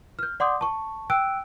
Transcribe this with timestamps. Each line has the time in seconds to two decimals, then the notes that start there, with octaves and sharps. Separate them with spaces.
0.19 F6 G6
0.40 D5 F#5 C6 D6 D#6 G6
0.61 A5 C#6
1.10 G5 E6 F#6 D7